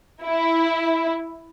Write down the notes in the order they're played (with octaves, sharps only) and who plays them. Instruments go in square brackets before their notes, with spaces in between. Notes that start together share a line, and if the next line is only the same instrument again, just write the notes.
[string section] E4